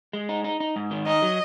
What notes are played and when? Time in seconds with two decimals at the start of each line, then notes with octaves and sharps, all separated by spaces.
0.13 G#3
0.29 D#4
0.44 D#4
0.60 D#4
0.76 G#2
0.91 D#3
1.07 D#4 D#5
1.22 F#3